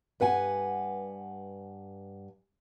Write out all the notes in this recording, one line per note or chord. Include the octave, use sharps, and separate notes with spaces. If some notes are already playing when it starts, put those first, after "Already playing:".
G2 B4 F#5 G#5